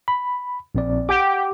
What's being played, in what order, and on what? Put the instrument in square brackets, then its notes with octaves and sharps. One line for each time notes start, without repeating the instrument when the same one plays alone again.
[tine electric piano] B5
A#1 C4 D5
[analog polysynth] G4 [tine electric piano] F#5 D6